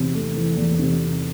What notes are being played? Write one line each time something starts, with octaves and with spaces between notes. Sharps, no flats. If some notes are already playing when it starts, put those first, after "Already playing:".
Already playing: E2 C3
A3
E3
E2
C3